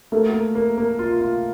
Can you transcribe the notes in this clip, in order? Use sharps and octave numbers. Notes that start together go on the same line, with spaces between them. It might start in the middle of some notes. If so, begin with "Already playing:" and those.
A3 A#3
A#3
A#3
A#3
F4
F4